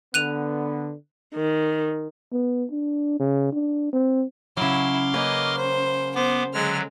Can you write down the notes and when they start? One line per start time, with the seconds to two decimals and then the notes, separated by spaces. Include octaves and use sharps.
0.14 D3 B3 F#6 D#7 F7
1.35 D#3
2.32 B3
2.71 D4
3.20 C#3
3.52 D4
3.93 C4
4.57 C#3 F#3 E4 C6 D6 F6
5.14 A#3 C#4 B4 D#5
5.57 C5
6.15 B3 C5 D6
6.54 D3 F#3 G#3 F6